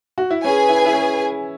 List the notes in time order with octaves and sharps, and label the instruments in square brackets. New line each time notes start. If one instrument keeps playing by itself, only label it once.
[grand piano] F#4
E4
[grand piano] C#4 [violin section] G#4 B4 G#5
[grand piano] E4
E4
C#4